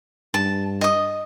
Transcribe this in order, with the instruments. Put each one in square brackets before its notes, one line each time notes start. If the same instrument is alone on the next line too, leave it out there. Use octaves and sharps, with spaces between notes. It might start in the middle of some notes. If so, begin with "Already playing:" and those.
[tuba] G2 [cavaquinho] A5
[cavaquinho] D#5 D#6